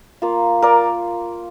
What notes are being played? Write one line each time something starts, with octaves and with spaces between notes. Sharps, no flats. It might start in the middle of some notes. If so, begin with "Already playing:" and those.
A#3 F4
A#4 D5